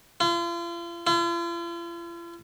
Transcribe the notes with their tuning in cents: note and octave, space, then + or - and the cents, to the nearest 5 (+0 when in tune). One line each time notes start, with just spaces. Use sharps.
F4 -40
F4 -45